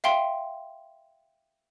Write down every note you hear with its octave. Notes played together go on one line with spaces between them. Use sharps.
E5 F5 G5 C6